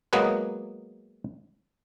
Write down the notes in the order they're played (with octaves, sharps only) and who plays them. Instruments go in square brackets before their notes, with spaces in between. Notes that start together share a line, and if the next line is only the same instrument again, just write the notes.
[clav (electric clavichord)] F#3 G#3 A#3 B3 G#4 B4